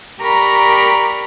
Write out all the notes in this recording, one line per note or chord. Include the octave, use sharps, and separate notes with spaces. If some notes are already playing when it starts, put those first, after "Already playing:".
G4 A#4 D5 A#5 B5 C#6